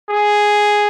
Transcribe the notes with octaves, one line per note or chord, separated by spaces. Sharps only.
G#4